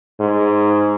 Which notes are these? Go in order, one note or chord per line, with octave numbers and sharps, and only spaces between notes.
G#2